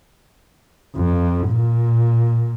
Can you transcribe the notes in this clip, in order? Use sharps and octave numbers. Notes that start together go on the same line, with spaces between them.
F2
A#2